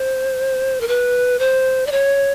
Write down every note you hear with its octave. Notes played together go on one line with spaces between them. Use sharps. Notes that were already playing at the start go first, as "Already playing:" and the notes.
Already playing: C5
A#4
B4
C5
D5
C#5